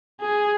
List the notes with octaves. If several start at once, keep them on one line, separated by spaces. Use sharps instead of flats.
G#4